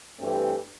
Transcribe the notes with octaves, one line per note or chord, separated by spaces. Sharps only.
G2 E3 A3 C4 G4